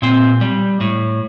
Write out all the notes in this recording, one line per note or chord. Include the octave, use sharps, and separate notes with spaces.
A#2 C4
G3
A2